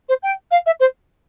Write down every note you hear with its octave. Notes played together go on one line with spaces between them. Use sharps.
C5
G5
F5
E5
C5